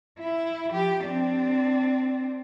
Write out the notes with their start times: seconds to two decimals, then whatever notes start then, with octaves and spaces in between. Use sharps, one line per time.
0.19 E4
0.70 F3 G4
1.04 C4 D4